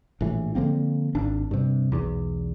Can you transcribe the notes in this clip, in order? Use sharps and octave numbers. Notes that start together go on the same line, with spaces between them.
A#1 A2 E3
D3 F3 A#3 C4
G#1 D4
G2 C3
B1 E2